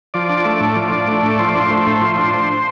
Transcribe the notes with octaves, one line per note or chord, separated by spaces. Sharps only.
F3 D5
D4
A3
A2
F3
D4
A3
A2
F3 C5
D5
D4 C5
A3
A2
F3
D4